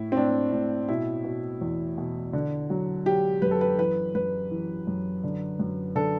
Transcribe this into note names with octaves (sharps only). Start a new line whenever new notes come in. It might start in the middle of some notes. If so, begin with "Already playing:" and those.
Already playing: A2 E4
C4
A2 D4
A2 D4
B2 E4
B2
E2
B2
D3
F#3
F#3 G4
F#2 B4
A4
B4
E3 B4
F#2 B4
E3
F#2
D3
F#2
D3 A4